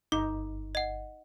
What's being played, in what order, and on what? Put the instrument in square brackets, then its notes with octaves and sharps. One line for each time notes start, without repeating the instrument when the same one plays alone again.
[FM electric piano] G1 [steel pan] D#4 [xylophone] D6
[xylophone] D#5 F#5